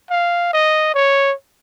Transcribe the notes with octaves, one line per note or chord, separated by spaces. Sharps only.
F5
D#5
C#5